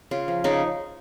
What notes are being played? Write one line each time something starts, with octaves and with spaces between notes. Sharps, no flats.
C#3 F4
F3
C#3 D#4